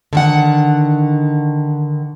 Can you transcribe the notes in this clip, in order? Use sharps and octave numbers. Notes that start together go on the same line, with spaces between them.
D3 D#3 F#5